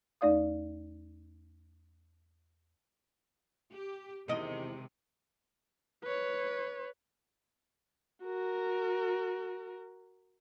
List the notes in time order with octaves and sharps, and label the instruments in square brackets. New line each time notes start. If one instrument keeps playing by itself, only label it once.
[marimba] E2 A3 D#4 D5 F5 D#6
[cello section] G4
[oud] E2 D#5 [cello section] C3 D#3 G#3
[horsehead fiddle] B4 C#5
[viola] F#4 A#4